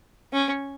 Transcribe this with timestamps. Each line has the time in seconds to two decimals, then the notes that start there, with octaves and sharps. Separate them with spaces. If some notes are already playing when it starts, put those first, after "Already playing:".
0.33 C#4